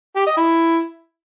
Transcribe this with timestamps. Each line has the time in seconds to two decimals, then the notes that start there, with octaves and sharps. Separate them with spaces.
0.16 G4
0.27 D#5
0.37 E4